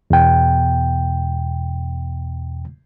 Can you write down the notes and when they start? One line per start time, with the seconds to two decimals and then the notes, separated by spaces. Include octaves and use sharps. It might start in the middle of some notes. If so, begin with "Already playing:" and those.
0.10 E2 B2 G5